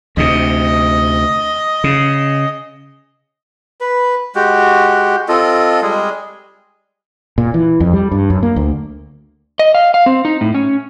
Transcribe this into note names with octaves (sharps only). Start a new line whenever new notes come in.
D2 C3 D#5
C#3
B4
G#3 F#4 G4
C4 F4 A4 D#5
G3 G#3 G#4
A#2
E3
F2
G3
G2
F#2
A#3
D2
D#5
F5
F5
C4
D#4
A2
C#4